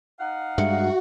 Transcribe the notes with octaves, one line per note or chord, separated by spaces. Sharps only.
D#4 F5 F#5
G2 G#3 F#4 E5 C#7